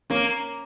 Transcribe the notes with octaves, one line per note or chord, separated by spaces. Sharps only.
A#3 C#4